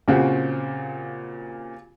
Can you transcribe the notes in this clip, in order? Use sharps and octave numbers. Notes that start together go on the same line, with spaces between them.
A#2 C#3 C4 F#4 G4